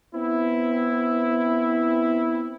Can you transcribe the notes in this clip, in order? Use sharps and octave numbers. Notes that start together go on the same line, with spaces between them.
B3 C4 E4